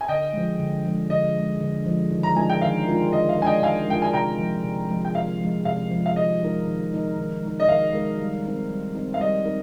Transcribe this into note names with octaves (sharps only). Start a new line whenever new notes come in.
G#5
D3 D#5 G5
F3 G#3
D3
F3 G#3
D3 D#5
F3 G#3
D3
F3 G#3
D#3
A#5
G#3 D4 F4 A#4 G#5
G5
D#3 F5
G#3 D4 F4 A#4
D#3 D#5
F5
G#3 D4 F4 A#4 G#5
D#5 G5
D#3 F5 G#5
G#3 D4 F4 A#4 G5
G#5
C3 G5 A#5
F3 G#3
C3
F3 G#3
G5
C3 F5
F3 G#3
C3 F5
F3 G#3
F5
D#3 D#5
G#3 D#4 A#4
D#3
G#3 D#4 A#4
D#3
G#3 D#4 A#4
D#5
D#3 F5
G#3 D#4 A#4
G3
C4 D#4 A#4
G3
C4 D#4 A#4
F5
G3 D#5
C4 D#4 A#4